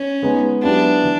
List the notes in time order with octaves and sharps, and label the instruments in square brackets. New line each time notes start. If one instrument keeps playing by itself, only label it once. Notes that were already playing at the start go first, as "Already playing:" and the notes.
Already playing: [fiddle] C#4
[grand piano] G#3 B3 D#4
[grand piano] F#3 B3 E4 G4 [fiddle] D4
[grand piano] E3